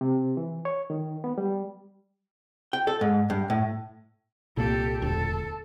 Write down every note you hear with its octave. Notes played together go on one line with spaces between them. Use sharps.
C3
E3
C#5
D#3
B3
G3
G5
A4
G#2
G2
A2
C2 A#2 A#3 G4 A4
E1 D2 A4